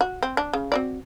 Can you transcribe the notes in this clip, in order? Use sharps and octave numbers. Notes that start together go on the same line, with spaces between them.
F#4
C4
D4
C#3
C4 F#4 D5